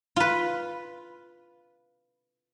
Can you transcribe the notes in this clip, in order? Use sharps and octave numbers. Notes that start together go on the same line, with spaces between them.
F4 B4